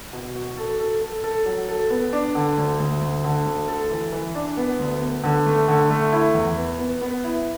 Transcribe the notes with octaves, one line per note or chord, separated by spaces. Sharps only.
B2
F#4
A4
A4
A4
A4
F#3
A4
B3
D4
D3
D2
D2
D2
D3
D2
A4
E3
E3
D4
B3
D2
B3
D3
A3
D3
A3
E4
E2
B3
B3
B3
E4